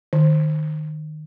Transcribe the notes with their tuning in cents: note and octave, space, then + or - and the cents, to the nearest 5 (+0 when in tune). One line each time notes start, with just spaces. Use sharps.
D#3 -20